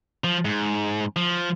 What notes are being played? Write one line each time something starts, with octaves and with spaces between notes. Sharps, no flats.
F3
G#2
F3